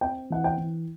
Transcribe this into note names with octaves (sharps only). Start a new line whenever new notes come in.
C4 G5
E3 F#5
G5
E3